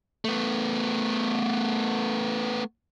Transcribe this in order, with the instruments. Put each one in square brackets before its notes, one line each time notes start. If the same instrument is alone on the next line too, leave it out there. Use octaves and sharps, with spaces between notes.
[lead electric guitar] A3 B3